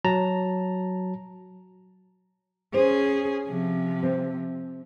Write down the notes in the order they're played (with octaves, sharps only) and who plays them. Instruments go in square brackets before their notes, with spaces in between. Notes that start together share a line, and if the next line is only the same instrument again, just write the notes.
[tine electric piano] F#3 A5 A#5
[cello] C#4 G#4 [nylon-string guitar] C5
[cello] C3 F3
[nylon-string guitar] C4